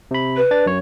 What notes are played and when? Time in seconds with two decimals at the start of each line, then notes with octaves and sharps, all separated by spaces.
0.11 C3 B5
0.37 B4
0.51 D4 A6
0.66 F#2 C#5